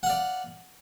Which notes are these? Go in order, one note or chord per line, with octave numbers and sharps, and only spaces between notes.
D5 F5 F#5